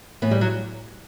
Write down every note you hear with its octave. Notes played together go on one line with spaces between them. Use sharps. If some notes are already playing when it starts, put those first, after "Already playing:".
A2 E3 B3
G3
F#3